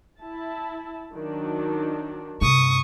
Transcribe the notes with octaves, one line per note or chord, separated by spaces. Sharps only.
E4 A5
D#3 F#3 D4
G2 C3 C#6 D#6